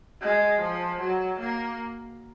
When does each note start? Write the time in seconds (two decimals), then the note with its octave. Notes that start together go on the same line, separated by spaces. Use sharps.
0.22 G#3
0.61 F3
1.00 F#3
1.40 A#3